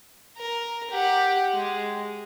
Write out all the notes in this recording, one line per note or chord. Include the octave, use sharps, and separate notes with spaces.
A#4
G4 F#5
G#3